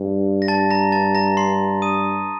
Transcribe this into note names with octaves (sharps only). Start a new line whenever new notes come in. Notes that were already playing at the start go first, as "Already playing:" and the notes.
Already playing: G2
A#6
A5 A6
A#5 A#6
A5 A6
A#5 A#6
C6 C7
D#6 D#7